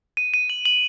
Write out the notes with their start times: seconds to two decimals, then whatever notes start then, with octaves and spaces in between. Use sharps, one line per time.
0.17 D#7
0.34 D#7
0.50 F#7
0.66 F#7